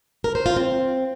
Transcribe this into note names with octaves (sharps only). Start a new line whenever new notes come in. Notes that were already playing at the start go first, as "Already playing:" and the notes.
A#4
C5
F4
C4